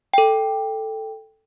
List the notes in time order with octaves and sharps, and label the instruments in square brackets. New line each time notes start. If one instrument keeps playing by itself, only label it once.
[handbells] A4 G5